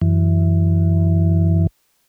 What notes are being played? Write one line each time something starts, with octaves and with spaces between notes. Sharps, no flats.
F#2 E3